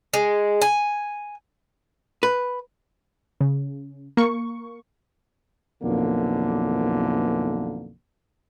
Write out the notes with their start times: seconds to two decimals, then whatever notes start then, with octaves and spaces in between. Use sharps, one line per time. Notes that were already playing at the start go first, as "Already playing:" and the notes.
0.14 G#3
0.61 G#5
2.23 B4
3.41 C#3
4.17 A#3 C#6
5.83 B1 F2 D3 E3 A#3